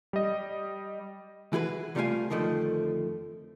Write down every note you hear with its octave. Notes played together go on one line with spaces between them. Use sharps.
G3 D#5
E3 F#4 G#4 B4
C2 G3 A3 F4 F5 G#5
F2 D3 D#3 F3 A3